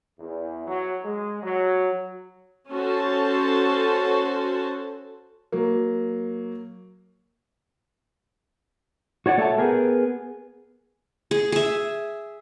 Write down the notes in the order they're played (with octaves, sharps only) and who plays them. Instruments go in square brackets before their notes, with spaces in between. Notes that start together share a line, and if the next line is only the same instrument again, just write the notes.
[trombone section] E2
F#3
G#3
F#3
[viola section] C#4 F#4 A4 C5 A5
[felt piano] F#3 A#3
[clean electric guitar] F#4 C#5 D5 F#5
A3 A4 C#5 D#5 E5 A5
B3 G4 G#4 A#4
[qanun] G#4
G#4 E5